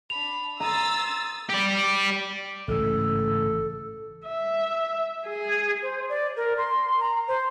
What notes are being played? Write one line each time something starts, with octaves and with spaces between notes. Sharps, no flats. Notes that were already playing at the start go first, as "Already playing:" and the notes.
D4 B5 F7
A#5 C6 D#6 E6 A6
G4 D5
A1 G#2 C#3 A4
E5
G#4
C5
D5
A#4
C6
A#5
C5